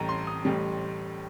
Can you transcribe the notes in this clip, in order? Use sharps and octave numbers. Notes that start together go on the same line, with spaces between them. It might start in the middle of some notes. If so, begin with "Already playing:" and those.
Already playing: A1 A2 G3 A#5
C6
D#6
A1 A2 G3